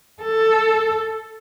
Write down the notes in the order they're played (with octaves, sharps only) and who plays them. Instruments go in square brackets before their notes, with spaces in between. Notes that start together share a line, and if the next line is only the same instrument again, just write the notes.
[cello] A4